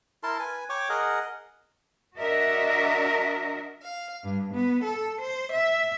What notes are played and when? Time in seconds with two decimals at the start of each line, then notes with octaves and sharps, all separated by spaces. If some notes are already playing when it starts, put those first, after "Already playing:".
0.23 E4 A#4 A5 C6
0.39 B4 G#5
0.70 C#5 G5 C#6 D6
0.89 G#4 A#4 D#5 F#5
2.17 D4 F#4 A#4 D#5 E5
3.82 F5
4.24 G2
4.53 B3
4.84 A4
5.21 C5
5.52 E5